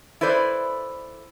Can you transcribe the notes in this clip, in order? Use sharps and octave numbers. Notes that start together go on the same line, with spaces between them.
E4 A4 B4 C5 D5